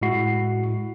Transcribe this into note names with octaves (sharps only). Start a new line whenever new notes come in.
A2 G#3 E4 F#4 C7